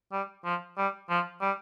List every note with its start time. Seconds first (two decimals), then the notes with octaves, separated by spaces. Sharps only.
0.12 G3
0.45 F3
0.78 G3
1.10 F3
1.42 G3